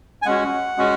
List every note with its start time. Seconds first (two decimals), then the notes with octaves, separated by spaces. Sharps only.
0.22 G#5
0.26 G#3 C#4 F#4 F#5
0.77 G#3 C#4 F#4